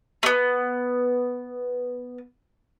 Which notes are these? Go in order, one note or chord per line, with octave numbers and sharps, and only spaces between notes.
A3 B3